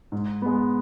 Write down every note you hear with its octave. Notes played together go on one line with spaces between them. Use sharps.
G#2
G#3 B3